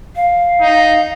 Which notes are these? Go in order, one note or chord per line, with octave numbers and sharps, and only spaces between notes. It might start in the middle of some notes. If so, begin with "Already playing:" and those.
F5
D#4